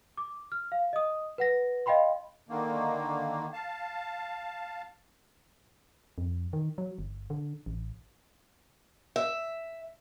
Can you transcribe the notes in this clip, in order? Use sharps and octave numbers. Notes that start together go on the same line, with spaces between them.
D6
F6
F5
D#5 D#6
B4 F#5 A#6
D#5 F5 G5 B5 C6
D3 D#3 A#3
F5 A5
F2
D#3
F#3
G1
D3
A1
E5